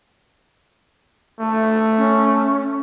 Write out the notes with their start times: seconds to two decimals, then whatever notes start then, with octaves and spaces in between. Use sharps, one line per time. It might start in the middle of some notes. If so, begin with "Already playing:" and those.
1.40 A3
1.98 C#4